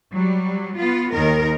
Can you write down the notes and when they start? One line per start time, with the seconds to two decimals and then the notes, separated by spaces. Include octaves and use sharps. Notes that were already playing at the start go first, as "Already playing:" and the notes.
0.11 F#3 G3
0.76 B3 F4
1.12 D#2 D#3 A#4